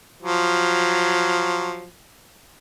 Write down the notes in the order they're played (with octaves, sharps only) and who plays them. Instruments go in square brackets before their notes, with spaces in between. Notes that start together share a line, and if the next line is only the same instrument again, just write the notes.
[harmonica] F3 F#3